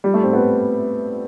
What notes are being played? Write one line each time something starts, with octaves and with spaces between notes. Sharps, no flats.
G3
A3
C4
B3